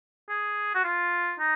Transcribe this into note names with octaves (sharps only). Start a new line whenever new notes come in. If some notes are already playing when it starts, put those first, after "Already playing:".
G#4
F#4
F4
D#4